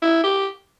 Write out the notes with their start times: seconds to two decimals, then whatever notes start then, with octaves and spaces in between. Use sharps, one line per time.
0.02 E4
0.24 G4